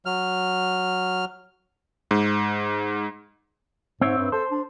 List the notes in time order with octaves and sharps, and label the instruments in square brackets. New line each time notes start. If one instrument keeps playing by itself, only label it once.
[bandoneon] F#3 F6
[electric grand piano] G#2
[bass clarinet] G#2 [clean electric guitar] C4 C#5 E5
[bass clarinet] G2
[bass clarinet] A4 [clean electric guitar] C5
[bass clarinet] D4